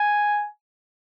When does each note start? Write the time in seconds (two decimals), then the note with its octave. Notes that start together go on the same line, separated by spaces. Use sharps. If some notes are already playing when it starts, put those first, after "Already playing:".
Already playing: G#5